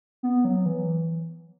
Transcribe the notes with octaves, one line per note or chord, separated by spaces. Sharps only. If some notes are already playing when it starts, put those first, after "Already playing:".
B3
F#3
E3